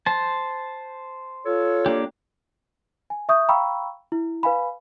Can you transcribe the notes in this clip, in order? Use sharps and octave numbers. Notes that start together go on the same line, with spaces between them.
C5 A5
F4 A4 C#5
A#3 D4 G4
G#5
E5 C#6 D#6 G6
F5 G5 A#5 B5 C#6 E6
E4
B4 F5 G#5 B5